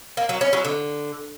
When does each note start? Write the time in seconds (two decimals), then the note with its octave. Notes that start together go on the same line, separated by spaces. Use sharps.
0.17 A#3
0.29 F#3
0.41 C#4
0.53 F#3
0.65 D3